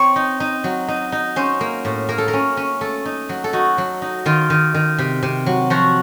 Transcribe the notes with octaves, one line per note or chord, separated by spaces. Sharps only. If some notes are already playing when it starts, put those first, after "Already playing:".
Already playing: C4 C#5
D#4
D#4
F#3
D#4
D#4
C#4 C5
A#3
A2
A#3 A#4
A4
A#4
C#4
C#4
A3 A4
D#4
F#3
A4
D#4 F#4
F#3
D#4
D#3 F4
D#3
D#3
C3
C3
F#3
F3 F#4